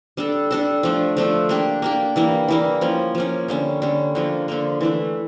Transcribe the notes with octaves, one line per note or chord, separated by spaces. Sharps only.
G3 D4 A4
G3 D4 A4
F3 A3 D4
F3 A3 D4
A#3 D4 G4
A#3 D4 G4
E3 G3 A#3
E3 G3 A#3
F3 A#3 C#4
F3 A#3 C#4
D3 G3 C#4
D3 G3 C#4
D3 F3 A#3
D3 F3 A#3
E3 A3 D4